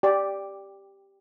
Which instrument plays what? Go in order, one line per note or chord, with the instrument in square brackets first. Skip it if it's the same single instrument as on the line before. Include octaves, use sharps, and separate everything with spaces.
[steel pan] G4 D5